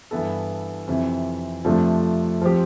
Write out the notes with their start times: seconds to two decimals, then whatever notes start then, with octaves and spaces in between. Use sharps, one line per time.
0.11 G2 E3 B3 E4 A4
0.87 F2 C3 E3
1.64 F2 C3 F3 A3 D4
2.42 F3 C4 G4